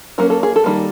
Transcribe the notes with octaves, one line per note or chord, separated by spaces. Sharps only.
F#3 A#3 C#4 A#4
A4
G#4
A4
D#3 G3 A#3